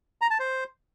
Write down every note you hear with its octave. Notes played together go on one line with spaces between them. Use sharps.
A#5
A5
C5